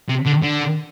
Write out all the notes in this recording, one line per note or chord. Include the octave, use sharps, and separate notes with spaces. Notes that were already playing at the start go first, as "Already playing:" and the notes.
C3
D3
D3